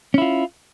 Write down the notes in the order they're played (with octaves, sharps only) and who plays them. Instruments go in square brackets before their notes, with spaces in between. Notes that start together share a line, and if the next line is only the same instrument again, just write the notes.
[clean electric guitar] C#4
E4
F4